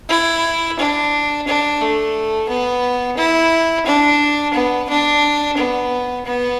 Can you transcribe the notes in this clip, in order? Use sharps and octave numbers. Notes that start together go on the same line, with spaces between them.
E4
D4
D4
A3
B3
E4
D4
B3
D4
B3
B3